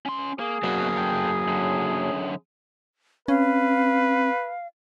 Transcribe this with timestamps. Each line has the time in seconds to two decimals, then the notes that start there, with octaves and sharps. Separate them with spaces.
0.06 C#4 C6
0.39 A#3 G#4
0.63 B2 F#3 A#3 F#4
0.97 A4 G5
1.48 F#2 D3
3.28 C4 C#4 B4 F5